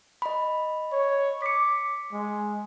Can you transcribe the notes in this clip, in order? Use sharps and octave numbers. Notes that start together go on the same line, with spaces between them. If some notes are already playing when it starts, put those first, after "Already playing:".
D#5 B5
C#5
D6 B6 C#7
G#3